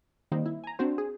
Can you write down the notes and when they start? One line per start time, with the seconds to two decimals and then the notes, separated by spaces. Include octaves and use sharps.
0.32 D#3 G3 A#3 C4 D#4
0.46 E4
0.64 G#5 A#5
0.79 C4 D4 F#4 C5
0.98 G#4